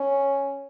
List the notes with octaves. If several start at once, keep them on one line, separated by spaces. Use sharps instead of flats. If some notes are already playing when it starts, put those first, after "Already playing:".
Already playing: C#4